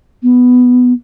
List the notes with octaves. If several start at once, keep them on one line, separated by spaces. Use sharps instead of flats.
B3